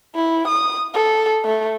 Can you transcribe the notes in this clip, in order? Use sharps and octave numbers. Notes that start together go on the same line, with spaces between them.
E4
D#6
A4
A3